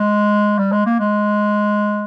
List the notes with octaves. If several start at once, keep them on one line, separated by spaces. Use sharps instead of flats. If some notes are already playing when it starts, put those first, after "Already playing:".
Already playing: G#3
G3
G#3
A#3
G#3